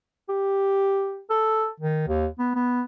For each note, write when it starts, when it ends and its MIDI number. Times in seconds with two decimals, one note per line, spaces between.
0.29 1.21 67
1.30 1.67 69
1.80 2.06 51
2.08 2.27 39
2.39 2.51 59
2.55 2.82 59